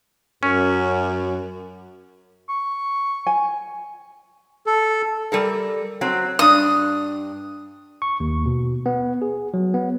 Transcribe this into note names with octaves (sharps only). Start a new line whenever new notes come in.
F#2 C#4
C#6
G#5
A4
G3 A4 A#4
F#3 C4
G2 D4 D#6
C#6
D#2
B2
B3
G#4
F#3
B3